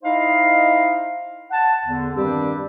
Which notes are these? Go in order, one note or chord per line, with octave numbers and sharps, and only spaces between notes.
D#4 E4 C5 D#5 F5
F#5 A5
E2 D3
G2 D#3 G3 C4 D4 G4